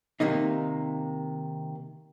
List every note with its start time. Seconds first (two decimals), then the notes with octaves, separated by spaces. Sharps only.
0.20 C3 D#3 A#3 D#4